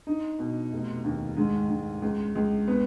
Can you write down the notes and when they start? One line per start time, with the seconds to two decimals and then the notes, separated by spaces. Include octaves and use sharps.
0.07 D#4
0.39 B2
0.73 F1
1.04 D#2
1.37 G#2
1.69 G#2
2.02 C#2
2.35 C#2
2.68 B3